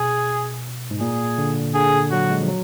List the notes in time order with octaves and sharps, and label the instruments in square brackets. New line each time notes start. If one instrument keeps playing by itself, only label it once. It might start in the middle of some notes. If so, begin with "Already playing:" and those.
Already playing: [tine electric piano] B2 [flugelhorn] G#4
[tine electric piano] G#2
[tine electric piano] A#2 [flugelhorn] G#4
[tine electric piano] D3
[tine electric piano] D3 [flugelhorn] G#4
[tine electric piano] F#3 [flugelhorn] F#4
[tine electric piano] G#3
F3
F#3